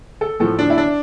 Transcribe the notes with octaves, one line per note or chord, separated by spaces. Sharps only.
A4
A2 F3 A4
D4
E4
D4